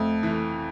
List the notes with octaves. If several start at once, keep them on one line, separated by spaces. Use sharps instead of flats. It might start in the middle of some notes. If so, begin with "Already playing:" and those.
Already playing: F2 A3
E3